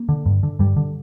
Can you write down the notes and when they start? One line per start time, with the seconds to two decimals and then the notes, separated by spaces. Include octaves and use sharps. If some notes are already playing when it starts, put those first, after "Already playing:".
Already playing: A#3
0.09 D3
0.26 G2
0.43 D3
0.59 G2 G3
0.76 D3